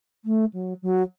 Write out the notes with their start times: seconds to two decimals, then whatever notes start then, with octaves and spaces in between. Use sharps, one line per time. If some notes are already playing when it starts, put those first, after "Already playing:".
0.25 A3
0.53 F#3
0.82 F#3